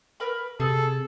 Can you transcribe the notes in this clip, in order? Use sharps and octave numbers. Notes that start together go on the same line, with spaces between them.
A#4 B4 B5
C3 G#4 A4 G6